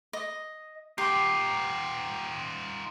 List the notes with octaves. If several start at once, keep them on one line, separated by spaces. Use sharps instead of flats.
D#5
D#4 F4 G4 C7